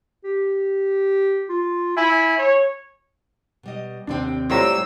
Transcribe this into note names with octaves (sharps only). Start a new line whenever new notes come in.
G4
F4
E4 G#5
C#5
B2 G3 D#5
D#2 C3 C4 D4 D5 G5
A2 G3 F4 C5 C#5 A#5 E6